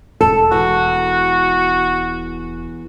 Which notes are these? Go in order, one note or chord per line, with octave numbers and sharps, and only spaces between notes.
E1 A4
E2 F#4